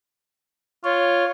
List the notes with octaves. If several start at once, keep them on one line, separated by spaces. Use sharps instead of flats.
F4 C#5